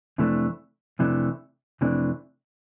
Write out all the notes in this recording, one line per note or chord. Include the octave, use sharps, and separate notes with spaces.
F2 C3 E3 A3 D4
F2 C3 E3 A3 D4
F2 C3 E3 A3 D4